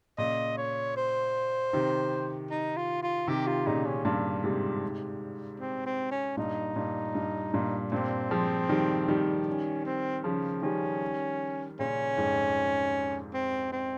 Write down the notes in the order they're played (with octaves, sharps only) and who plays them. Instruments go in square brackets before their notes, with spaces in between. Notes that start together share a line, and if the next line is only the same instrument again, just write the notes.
[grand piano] A#2 C#3 [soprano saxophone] D#5
[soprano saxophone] C#5
C5
[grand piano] C3 D#3
[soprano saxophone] D#4
F4
F4
[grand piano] C3 D#3 [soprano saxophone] G4
[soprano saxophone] F4
[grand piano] A#2 C#3 [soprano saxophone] D#4
[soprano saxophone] C#4
[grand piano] G2 A#2
G#2 C3
[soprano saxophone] C4
C4
C#4
[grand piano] G2 A#2 [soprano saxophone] D#4
[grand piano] G2 A#2
G2
G2 A#2
[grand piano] G2 A#2 [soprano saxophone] C4
[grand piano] F3 G#3
D#3 G3
D#3 G3
[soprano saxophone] C#4
C4
[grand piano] C#3 F3
[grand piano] D#3 G3 [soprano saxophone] C#4
[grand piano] A#2 C#3 [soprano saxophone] C#4
[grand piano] F2 G#2
[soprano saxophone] C4
C4